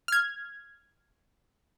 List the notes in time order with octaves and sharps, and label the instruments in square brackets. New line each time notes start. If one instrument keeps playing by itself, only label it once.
[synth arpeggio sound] F6 G#6